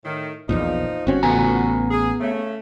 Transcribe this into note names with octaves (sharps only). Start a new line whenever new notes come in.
A2 D#3
A#1 E2 A#2 F3 D#4
G1 C4 C#4 F#4
A1 B3 G#5 A#5
G#4
C#3 A3